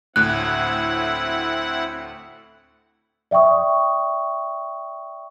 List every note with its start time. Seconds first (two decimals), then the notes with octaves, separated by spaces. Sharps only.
0.16 D2 A2 C4 E4 F#5 F#6
3.31 D5 E5 G5 C#6 D#6